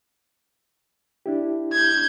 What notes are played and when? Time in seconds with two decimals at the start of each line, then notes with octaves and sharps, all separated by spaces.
1.26 D4 E4 G4
1.73 G6 G#6